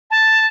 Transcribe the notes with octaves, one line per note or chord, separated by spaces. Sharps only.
A5